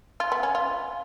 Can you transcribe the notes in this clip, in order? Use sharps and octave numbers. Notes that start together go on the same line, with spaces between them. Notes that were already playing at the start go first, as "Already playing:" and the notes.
F4
B3
C#4
F4